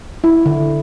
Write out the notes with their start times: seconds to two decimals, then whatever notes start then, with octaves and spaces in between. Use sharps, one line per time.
0.24 E4
0.46 D3